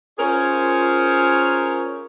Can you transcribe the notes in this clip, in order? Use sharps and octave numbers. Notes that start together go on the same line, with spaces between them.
C#4 F4 G#4 A#4 C5 C#5